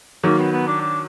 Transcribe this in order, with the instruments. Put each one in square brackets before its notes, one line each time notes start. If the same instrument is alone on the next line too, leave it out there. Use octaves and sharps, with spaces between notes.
[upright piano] D#3 F#3 [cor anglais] A#3
[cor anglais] B3
B3
D4
D4